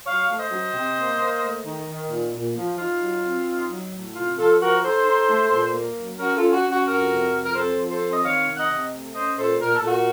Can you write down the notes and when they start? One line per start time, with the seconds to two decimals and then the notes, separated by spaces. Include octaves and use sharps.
0.05 F#3 C#5 F5
0.29 A3
0.39 C5 D#5
0.51 F#3
0.74 C3
0.97 A#3
1.19 A#3
1.42 A3
1.64 D#3
1.87 D#3
2.10 A#2
2.33 A#2
2.55 F3
2.77 D#4 F4
3.00 F#3
3.24 C4
3.46 D#4
3.69 F#3
3.91 A2
4.14 C3 F4
4.37 F3 F4 A4
4.59 F3 F#4 A#4
4.82 D#4 A4 C5
5.05 D#4
5.28 A3
5.51 A#2
5.73 A#3
5.96 F#3
6.18 C#4 F#4 A#4
6.36 F4 A4
6.41 C#4
6.52 F#4
6.64 C#4
6.70 F#4
6.87 F2 F#4 A#4
7.09 C3
7.32 F2
7.43 A#4
7.55 C4 A4 C5
7.78 F3
7.89 A4 C5
8.01 C4
8.13 D#5
8.23 D#3 C#5 F5
8.46 C3
8.57 D#5 F#5
8.68 C3
8.91 A3
9.14 C#4 C5 D#5
9.37 A#2 A4 C5
9.59 A#2 A#4
9.73 A4
9.82 A#2 F#4 A#4